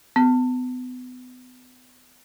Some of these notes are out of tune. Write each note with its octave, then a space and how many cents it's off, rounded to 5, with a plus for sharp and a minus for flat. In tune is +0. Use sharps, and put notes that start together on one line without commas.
B3 +30